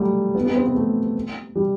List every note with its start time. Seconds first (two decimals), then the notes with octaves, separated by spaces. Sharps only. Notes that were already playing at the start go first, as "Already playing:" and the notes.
Already playing: F#3 G3 A3
0.35 B3
0.45 B3
0.56 C4
0.66 B3
0.75 A3
1.55 G3